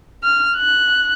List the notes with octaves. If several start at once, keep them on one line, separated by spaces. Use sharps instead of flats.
F6
F#6